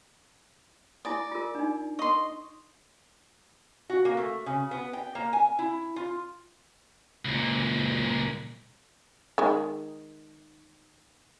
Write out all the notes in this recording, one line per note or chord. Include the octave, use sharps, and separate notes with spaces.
E4 D5 G#5 D#6
F4 A#4
D4 D#4
D#5 C6 C#6
F#4
A#3
A3
C#3
B3
G5
A#3
G#5
E4
F4
C#2 A#2
D#3 G#3